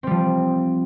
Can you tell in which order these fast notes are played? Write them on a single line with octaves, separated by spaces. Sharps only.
C4 G3 F3